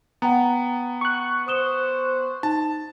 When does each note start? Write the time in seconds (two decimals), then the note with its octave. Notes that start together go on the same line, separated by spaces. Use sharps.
0.22 B3 F#5 G5 A#5
1.01 C#6 F#6
1.48 C5 D#6 E7 G7
2.43 D#4 A5